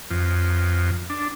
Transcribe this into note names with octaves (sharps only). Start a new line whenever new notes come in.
F2
D4